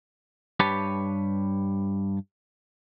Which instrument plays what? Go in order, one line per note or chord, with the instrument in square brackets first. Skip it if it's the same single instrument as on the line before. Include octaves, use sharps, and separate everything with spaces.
[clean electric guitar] G2 G4 B4 C#5 A5